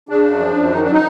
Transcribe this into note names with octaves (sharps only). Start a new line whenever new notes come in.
C#3 D4
F#2
F3
F#2
D#3 D#4
D4
F#3
D#4